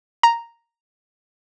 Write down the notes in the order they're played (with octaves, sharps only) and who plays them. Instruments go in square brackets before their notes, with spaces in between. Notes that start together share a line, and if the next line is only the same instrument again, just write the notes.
[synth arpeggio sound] A#5